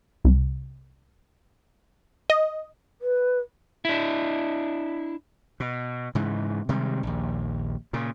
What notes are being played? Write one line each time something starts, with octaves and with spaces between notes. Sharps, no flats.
C2
D#5
B4
D4 E4
B2
G#2 C#3 E3
C3 D#3 G3 G#3
A#1 D#2
A#2 C#3